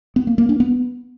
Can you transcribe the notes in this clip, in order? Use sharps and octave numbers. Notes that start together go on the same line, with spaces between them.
B3
A#3
A#3
D4
B3